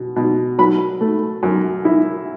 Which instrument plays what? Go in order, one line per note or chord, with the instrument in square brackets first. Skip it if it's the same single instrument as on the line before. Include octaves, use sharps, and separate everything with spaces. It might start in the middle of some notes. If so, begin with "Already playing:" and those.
Already playing: [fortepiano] B2
B2
F#3 B5
A3
F#2
E4